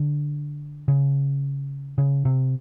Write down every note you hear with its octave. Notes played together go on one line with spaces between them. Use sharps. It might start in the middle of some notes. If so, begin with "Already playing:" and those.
Already playing: D3
C#3
C#3
C3